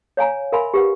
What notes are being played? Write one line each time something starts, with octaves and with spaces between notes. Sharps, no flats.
C#5 F5 G#5 A#5
A#4 E5 F5 G#5 B5 C6
G4 B4 F#5